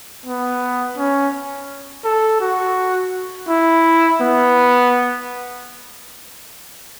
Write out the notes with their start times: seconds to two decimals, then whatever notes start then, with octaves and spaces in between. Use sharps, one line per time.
0.26 B3
0.97 C#4
2.05 A4
2.41 F#4
3.49 E4
4.21 B3